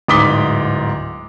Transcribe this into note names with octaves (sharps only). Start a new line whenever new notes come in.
D1 G#2 D6 D#6 B6 G7